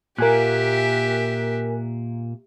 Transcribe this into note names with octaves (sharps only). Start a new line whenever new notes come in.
A#2 A#3 G4 A#4 E5 G#5 F#6